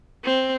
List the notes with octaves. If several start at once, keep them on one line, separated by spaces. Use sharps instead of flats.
C4